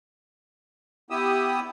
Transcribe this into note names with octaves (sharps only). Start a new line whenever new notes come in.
B3 E4 G4 D#6 E6